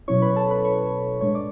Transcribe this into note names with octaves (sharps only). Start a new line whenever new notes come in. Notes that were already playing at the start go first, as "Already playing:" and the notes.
B2 F#3 C#4 E4 C#5 C#6
B4 B5
A4 A5
B4 B5
C#5 C#6
A2 G#3 D4 C#5 C#6
D5 D6